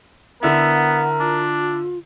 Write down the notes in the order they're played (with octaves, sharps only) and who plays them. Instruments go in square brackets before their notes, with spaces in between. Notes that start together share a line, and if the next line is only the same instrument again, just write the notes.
[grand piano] D3 E4 [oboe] B3 [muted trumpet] A#4 [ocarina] F#5
[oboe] D4 [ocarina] F4